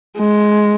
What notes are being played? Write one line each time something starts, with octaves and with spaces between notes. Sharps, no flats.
G#3